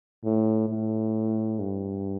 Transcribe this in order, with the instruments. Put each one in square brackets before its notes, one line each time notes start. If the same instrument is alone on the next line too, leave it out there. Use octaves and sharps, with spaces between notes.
[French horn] A2
A2
G2